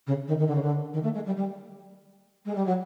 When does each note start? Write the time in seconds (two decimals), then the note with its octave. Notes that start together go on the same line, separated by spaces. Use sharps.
0.06 C#3
0.27 D#3
0.38 D#3
0.47 D3
0.54 C#3
0.62 D3
0.93 D#3
1.03 A3
1.13 G#3
1.25 G3
1.36 G3
2.45 G#3
2.55 G3
2.65 F#3